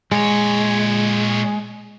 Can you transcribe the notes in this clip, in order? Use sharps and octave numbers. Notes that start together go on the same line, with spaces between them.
A#2 G#3 C#5